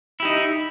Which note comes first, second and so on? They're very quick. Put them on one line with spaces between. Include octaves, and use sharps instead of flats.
E4 G4 D#4